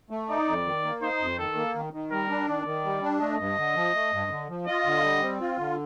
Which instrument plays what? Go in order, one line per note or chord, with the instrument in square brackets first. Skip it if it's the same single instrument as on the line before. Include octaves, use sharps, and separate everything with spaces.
[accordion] A3
[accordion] D#4 [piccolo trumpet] D5
[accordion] F2
D#3
A#3
[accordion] D#4 [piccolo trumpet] C5
[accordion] F2
[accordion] D#3 [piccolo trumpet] A4
[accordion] A#3
D#3
D#3
[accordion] G3 [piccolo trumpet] A#4
[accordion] D4
[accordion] D#3 [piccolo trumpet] D5
[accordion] D#3
G3
D4
[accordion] A3 [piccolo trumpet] D#5
[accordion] G2
D3
F3
A3
G2
D3
F3
[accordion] F4 [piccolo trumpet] D#5
[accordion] D3
G3
C4
F4
D3